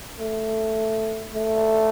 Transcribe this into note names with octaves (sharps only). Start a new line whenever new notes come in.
A3
A3